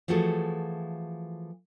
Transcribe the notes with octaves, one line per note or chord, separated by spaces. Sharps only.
E3 F3 A3 F#4 G#4 A4